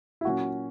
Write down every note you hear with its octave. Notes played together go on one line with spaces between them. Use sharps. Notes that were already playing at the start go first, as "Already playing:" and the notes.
E4
A#2 F#3 C#4 F#4